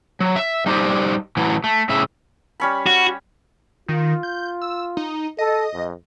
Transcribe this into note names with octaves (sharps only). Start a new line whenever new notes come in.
F#3
E5
G3 A3 D#4 G4 C5 D5
A2 E3 F#3
A3
A2 C#3 E5
G3 C#4 B5
F#4
D#3 F4
G6
E6
D#4
A4 D#5
F2